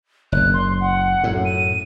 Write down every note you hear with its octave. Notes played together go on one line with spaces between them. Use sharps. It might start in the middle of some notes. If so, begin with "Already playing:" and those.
F#1 F#6
C6
F#5
F#2 A2
D#7